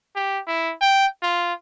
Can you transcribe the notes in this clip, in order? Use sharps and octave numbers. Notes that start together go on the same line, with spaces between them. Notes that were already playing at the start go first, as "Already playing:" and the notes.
G4
E4
G5
F4